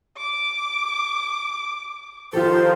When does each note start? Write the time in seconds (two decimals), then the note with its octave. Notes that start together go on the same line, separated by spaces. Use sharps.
0.17 D6
2.33 D#3 F3 F4 G4 A4 C5